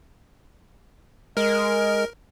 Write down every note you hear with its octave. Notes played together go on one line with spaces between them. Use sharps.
G#3 A#4 D#5